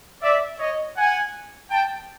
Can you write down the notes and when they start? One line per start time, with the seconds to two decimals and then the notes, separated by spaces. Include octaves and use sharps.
0.22 D5 E5
0.59 C#5 D#5
0.96 F#5 G#5
1.71 G5 A5